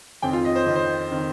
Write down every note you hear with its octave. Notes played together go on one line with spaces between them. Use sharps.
F2 D#3 C4 G5
F4
D#5
C5
F2 D#3 C4 D#5
C5
D#3 C4